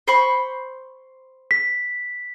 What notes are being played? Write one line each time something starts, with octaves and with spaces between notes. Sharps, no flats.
C5 B5 C#6
B6